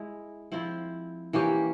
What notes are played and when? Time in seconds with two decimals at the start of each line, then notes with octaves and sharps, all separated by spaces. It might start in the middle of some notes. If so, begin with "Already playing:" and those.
Already playing: G#3 E4
0.52 F3 C4 E4
1.33 E3 A#3 C#4 G4